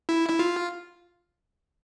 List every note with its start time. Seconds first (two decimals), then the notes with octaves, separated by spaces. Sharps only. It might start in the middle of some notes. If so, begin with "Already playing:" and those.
0.09 E4
0.29 E4
0.39 F4